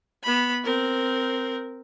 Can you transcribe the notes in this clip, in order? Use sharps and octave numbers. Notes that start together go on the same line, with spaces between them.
B3 B5
C4 A#4